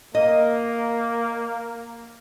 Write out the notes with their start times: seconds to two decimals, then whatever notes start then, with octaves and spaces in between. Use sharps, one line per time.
0.15 A#3 D#5